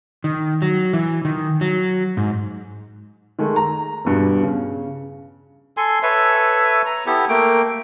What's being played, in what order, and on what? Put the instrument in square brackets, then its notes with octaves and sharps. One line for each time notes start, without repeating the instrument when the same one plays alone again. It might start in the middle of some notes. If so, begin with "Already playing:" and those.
[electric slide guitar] D#3
F#3
E3
D#3
F#3
G#2
[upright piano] D#3 G#3 A3
A#5
E2 G2 B2
C#3
[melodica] A4 G#5 C6
A4 B4 C#5 E5
A#5
B3 E4 G4 A4
A3 A#3 G5